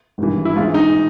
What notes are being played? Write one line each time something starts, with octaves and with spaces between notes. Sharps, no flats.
G#1 G2 E3
E4
A#1 G#2 E3 F4
D#4